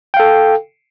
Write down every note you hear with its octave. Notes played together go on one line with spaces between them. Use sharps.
A4 F5 G5